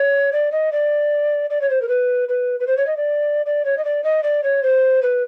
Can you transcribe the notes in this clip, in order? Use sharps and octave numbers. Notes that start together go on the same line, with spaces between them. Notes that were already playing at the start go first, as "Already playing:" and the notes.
Already playing: C#5
D5
D#5
D5
D5
C#5
C5
A#4
B4
B4
B4
C5
C#5
D#5
D5
D5
C#5
D#5
D5
D#5
D5
C#5
C5
B4